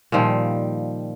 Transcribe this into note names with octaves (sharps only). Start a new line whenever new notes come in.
A#2 D#3 F3 G3